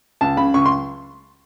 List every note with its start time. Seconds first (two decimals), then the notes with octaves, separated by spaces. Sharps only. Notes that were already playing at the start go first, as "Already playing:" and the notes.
0.21 C#2 A5
0.37 C#3 B5
0.54 C#2 C#6
0.66 C6